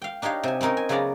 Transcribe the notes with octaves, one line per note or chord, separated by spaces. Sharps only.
F5 G5
D4 D#4 G4 C#5 F5
C3 G#5
C4 C#4 D#4 A#4 C#5
G#5
C#3 F#3 B3 F#4 D5 A#5